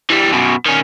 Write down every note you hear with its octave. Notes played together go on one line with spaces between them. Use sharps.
E3 G3
F#2 B2
D#3 C#4